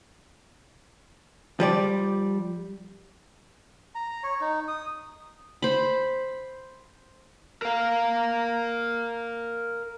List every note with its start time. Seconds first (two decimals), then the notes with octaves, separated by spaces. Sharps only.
1.60 F3 G3 D5
3.95 A#5
4.24 C#5
4.41 D#4
4.68 D#6
5.62 C5 B5
7.62 A#4 F5